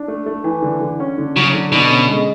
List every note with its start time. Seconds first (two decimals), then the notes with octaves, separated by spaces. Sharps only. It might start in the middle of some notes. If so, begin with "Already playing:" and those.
Already playing: D4
0.08 A3
0.26 A3
0.44 E3
0.62 D3
0.81 D3
1.00 C#4
1.18 D3
1.36 C#3 F#3
1.53 D3
1.72 B2 D3
1.90 C#4
2.08 G#3